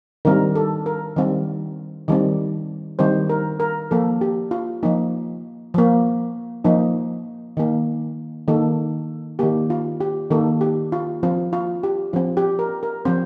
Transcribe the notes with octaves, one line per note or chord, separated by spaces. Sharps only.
D#3 G3 C4 A#4
A4
A#4
D#3 G3 C4
D#3 G3 C4
D#3 G3 C4 C5
A#4
A#4
F3 A#3 A4
G4
F4
F3 A#3 D#4
F3 A#3
F3 A#3 D#4
D#3 A#3
D#3 A#3 A4
D#3 A#3 G4
F4
G4
D#3 A#3 A4
G4
F4
F3 C4 F4
F4
G4
F3 C4 F4
G4
A#4
A#4
F3 C4 C5